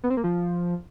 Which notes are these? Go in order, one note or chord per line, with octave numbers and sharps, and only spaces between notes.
B3
C4
A#3
F3